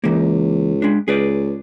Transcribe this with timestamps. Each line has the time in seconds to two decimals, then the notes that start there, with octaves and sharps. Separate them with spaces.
0.04 C#2 E3 A#3
0.82 G#3 D4
1.08 C#2 G#4 B4 D5